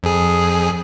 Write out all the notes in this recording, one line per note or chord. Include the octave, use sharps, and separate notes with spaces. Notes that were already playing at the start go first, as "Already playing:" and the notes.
F2 G#4